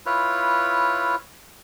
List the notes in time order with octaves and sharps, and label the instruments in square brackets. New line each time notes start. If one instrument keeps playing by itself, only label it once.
[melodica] E4 F4 B4 C#5